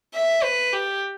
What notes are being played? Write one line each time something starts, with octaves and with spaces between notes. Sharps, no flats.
E5
B4
G4